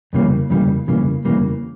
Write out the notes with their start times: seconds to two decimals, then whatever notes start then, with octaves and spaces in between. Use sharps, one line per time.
0.13 F2 C#3 E3 G3 A#3
0.50 F2 C#3 E3 G3 A#3
0.87 F2 C#3 E3 G3 A#3
1.25 F2 C#3 E3 G3 A#3